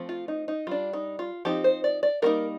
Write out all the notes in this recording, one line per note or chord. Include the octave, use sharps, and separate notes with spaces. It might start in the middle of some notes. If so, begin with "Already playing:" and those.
Already playing: F3 A3 C4
F4
D#4
D#4
G3 D4 F4
D#4
F4
F3 C4 D#4 G4
C5
D5
D5
G3 A#3 D#4 A#4